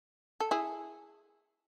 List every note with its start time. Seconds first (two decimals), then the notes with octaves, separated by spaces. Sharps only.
0.40 A4
0.51 E4 G#4